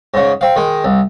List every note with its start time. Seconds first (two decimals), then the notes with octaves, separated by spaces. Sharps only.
0.14 G#2 C#3
0.41 C4 F5
0.56 D#3 G#3
0.84 C2